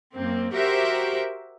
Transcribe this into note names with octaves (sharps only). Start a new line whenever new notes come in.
F#2 A#3 C4
F#4 G4 A#4 C5 E5